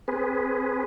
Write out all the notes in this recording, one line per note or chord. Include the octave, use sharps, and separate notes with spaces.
C4 G#4 B4